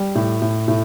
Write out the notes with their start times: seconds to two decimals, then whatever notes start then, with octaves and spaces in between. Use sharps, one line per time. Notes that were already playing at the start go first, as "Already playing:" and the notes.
Already playing: G3
0.15 A2
0.42 A2
0.68 A2